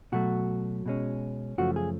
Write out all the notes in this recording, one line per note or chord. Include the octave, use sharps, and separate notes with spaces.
B2 F#3 A3 F#4
B2 G#3 C#4
F#2 C#3 F3 A3 F#4
G#4